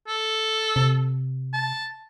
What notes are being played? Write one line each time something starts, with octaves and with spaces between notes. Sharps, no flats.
A4
C3
A5